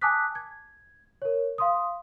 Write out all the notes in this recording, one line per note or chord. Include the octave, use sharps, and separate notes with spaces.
G#5 A5 D6 D#6 F#6 B6
G#6
A#4 C#5
F5 C6 D#6